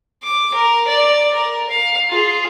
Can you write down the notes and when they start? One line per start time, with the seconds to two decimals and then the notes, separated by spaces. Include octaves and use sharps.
0.23 D6
0.54 A#4
0.87 D5
1.33 A#4
1.69 F5
2.10 F4 G#4